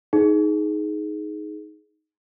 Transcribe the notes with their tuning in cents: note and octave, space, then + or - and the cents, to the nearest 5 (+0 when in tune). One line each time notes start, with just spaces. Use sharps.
D#4 +5 G#4 +15